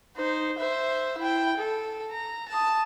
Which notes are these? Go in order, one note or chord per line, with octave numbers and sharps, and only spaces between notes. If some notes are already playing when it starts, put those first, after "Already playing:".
D#4 C5
C5 E5
E4 G5
A4
A#5
A5 D#6